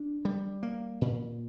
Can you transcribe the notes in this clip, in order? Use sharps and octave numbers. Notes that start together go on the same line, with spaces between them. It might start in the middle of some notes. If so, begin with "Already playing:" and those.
Already playing: D4
G3
A#3
A#2